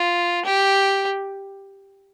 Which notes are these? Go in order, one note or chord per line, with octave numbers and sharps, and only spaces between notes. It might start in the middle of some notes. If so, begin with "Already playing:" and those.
Already playing: F4
G4